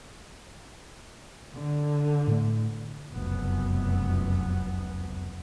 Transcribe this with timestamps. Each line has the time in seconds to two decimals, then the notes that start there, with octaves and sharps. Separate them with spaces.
1.54 D3
2.27 A2 A3
3.11 F1 C#2 F#2 B3